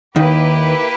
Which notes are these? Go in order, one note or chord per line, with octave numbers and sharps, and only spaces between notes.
D#2 D#3 A#3 E4 G4 B4